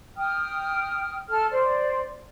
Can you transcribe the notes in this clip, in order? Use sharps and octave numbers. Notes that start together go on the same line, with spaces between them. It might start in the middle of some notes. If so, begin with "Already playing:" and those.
G5 D#6 F6
A4 F6
C5 D5